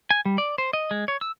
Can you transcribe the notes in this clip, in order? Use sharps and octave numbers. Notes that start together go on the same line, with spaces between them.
G#5
G3
D5
C5
D#5
G#3
C#5
E6